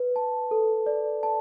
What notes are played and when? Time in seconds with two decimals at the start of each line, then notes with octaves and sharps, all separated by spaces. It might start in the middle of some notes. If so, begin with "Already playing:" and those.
Already playing: B4
0.16 A5
0.51 A4
0.86 D5
1.23 A5